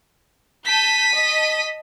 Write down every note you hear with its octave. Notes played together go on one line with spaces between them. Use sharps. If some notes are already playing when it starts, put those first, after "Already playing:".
A5 G6 B6 D#7
D#5 A5